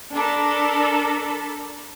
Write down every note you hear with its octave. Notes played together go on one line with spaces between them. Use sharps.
D4 A4 A#4 B5